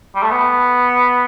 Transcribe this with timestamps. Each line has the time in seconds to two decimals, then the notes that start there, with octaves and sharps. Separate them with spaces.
0.15 G3
0.23 A3
0.31 B3